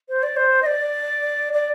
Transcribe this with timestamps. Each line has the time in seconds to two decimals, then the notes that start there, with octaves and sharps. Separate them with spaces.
0.09 C5
0.23 D5
0.36 C5
0.62 D#5
0.66 D5
1.53 D5